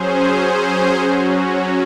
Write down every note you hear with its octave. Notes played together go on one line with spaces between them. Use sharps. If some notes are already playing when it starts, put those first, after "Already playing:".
Already playing: F#3 C#4 G#4 C5
F#3 C#4 F#4